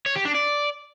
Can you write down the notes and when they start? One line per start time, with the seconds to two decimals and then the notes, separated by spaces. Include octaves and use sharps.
0.06 C#5
0.16 G4
0.25 D4
0.35 D5